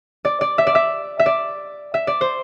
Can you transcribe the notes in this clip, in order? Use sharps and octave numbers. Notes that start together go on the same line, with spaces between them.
D5
D5
E5
D5
E5
E5
D5
E5
D5
C5